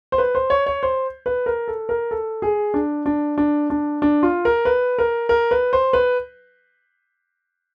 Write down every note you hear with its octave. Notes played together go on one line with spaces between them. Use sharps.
C5
B4
C5
C#5
C#5
C5
B4
A#4
A4
A#4
A4
G#4
D4
D4
D4
D4
D4
F4
A#4
B4
A#4
A#4
B4
C5
B4